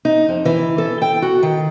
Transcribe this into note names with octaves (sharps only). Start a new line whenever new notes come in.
D#4
F2
E3
A4
G5
F#4
D#3